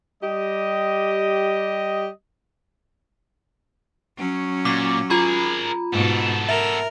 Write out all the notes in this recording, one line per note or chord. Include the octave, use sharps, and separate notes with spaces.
G3 G4 D#5
F#3 C#4
A#2 D6
F4 G#4 A#4 A#5 B5
G#2 B2 B3 A4
A#4 E5